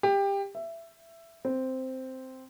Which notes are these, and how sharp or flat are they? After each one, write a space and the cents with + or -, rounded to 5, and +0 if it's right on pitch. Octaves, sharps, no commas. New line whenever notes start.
G4 +20
E5 +15
C4 -5